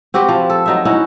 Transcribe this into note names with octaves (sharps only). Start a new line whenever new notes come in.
C4 F#4 G4 B4
F3
A4
F#3 D#4 E5
C#4 D#4 E4 F#4